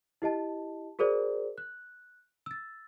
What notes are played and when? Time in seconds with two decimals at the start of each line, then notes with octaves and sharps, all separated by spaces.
0.22 E4 G4 D#5 A5
0.99 F#4 G#4 A#4 C5 D5
1.58 F#6
2.46 E6 A6